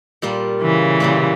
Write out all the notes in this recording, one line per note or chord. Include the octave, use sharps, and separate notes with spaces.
A#2 G3 A#3
C#3 E3
A#2 G3 A#3